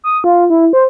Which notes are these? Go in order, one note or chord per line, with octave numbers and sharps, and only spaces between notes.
D#6
F4
E4
C5